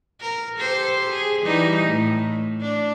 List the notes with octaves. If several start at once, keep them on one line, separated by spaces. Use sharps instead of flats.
A#4
G4 A4 C5
G#4
E3 G3 D#4
A2 A3
D4